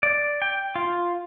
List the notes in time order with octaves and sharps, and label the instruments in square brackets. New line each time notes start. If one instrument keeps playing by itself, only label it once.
[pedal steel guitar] D5
G5
F4